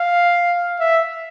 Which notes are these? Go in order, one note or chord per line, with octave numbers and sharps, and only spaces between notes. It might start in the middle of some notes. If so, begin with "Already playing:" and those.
Already playing: F5
E5